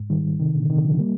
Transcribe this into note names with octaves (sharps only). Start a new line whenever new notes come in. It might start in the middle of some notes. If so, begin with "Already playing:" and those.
Already playing: G#2
D#3 G3
C3 D#3
A#2 D3
C3 D#3
D3 F3
G3 A#3